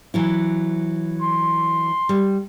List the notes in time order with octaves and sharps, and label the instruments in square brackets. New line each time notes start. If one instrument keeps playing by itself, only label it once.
[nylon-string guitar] E3 F#3 E4
[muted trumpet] C6
[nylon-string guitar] G3